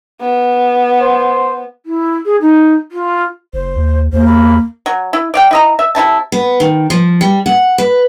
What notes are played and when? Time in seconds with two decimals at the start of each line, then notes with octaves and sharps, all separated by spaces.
0.21 B3
1.00 C5
1.86 E4
2.25 G#4
2.41 D#4
2.92 F4
3.53 F#1 C5
3.77 D#2
4.13 E2 A#3 C5
4.25 B5
4.86 F#3
5.13 E4
5.34 D5 F5 G5
5.51 E4 D#5 A#5
5.79 E5
5.95 C3 D#4 E4 A5
6.32 B3
6.60 D#3
6.90 F3
7.21 G3
7.46 F#5
7.78 B4